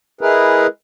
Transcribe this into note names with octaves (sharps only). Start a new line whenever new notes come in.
G#3 E4 G#4 A#4 B4